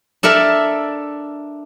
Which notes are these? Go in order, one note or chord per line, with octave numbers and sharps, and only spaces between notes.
D4 A4 A#4 E5